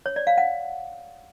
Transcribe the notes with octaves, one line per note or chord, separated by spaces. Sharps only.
C#5
D5
F5
F#5